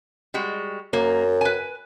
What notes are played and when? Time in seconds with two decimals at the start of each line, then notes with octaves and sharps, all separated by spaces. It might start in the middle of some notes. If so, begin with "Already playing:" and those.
0.34 G3 G#3 F#4
0.93 F#2 A#3
1.41 B4 G#5